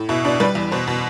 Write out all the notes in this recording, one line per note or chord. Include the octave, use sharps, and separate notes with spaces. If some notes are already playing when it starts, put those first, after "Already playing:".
Already playing: A2
B2 E4
B2 D4
G3 B4
E2
B2 C5
B2